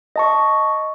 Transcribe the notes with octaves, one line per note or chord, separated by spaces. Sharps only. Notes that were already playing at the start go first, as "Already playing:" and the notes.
D#5 A5 C#6